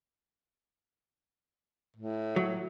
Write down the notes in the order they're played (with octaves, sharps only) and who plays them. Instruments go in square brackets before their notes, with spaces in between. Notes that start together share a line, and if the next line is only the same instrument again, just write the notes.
[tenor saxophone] A2
[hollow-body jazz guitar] F#3